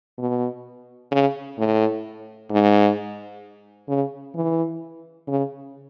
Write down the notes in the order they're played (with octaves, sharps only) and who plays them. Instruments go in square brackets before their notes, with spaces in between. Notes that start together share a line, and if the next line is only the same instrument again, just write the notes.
[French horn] B2
C#3
A2
G#2
C#3
E3
C#3